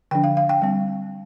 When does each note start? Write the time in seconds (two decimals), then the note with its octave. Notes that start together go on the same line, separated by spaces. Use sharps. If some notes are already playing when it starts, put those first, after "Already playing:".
0.11 D3 F3 D4 G5
0.24 F5
0.37 F5
0.49 G5
0.62 G3 C4